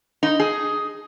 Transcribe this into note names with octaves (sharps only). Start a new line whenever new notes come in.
D#4
G#4